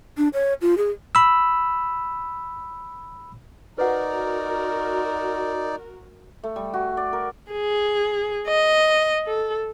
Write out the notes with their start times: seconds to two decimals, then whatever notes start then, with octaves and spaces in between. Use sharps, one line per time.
0.18 D4
0.34 C#5
0.62 F4
0.78 G#4
1.15 B5 E6
3.78 D#4 F#4 A#4 B4 D5 F#5
6.43 A3
6.56 G3
6.74 F#4
6.97 D5
7.13 A#4
7.52 G#4
8.48 D#5
9.28 A4